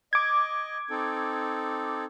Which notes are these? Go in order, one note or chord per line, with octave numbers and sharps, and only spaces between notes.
D#5 D6 G#6
C4 D#4 A4